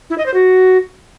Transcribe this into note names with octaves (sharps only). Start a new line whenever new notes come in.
E4
D#5
C5
F#4